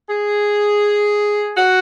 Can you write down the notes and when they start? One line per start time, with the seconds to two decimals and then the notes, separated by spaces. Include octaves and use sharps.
0.09 G#4
1.56 F#4